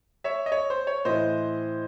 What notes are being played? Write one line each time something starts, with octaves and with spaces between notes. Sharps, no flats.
C#5 E5
D#5
C#5
C5
C#5
A2 E3 C5 D#5